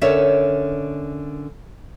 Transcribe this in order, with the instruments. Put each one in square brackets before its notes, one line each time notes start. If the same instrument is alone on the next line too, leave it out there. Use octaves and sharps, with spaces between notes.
[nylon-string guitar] D3 C#4 A#4 C#5 D5 E5